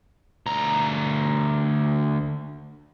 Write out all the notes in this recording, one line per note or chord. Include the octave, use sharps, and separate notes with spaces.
D2 A#5